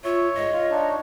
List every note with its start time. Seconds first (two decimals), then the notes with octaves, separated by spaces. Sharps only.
0.04 F4 C#5 E5
0.35 G#2 D#5
0.52 F4
0.71 D4 D#4